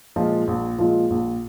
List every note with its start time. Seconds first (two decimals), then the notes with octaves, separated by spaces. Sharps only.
0.16 A#2 F3 G#3 F4
0.47 A#1
0.78 A#2 F3 G#3 F4
1.10 A#1